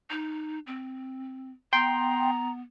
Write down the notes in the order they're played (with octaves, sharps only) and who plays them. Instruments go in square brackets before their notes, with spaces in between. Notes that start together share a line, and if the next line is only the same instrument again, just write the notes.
[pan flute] D#4
C4
[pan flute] B3 [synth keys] G5 C6 [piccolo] A#5